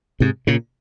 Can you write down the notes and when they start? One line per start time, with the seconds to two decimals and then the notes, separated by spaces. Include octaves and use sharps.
0.20 G#2 C3
0.47 A#2 C#3